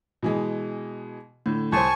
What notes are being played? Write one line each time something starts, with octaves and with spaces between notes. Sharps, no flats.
B2 E3 G#3
A2 D3
C2 C5 G#5 A5 C#6